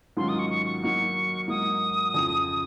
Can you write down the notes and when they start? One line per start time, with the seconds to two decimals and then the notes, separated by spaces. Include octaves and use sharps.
0.17 G#2 D#3 F#3 C#4 F4 C6
0.28 D#6
0.38 C#6
0.49 C#6
0.66 C#6
0.82 F#3 A#3 D#4 F#4 C#6
1.48 G#2 F#3 A#3 D#6
2.14 F2 C#3 F3